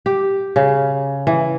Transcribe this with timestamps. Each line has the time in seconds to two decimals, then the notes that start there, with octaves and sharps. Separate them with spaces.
0.06 G4
0.56 C#3
1.27 E3